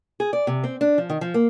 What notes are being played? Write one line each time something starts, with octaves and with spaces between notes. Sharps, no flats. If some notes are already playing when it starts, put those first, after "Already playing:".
G#4
D5
C3
C4
D4
F3
D#3
F3
A#3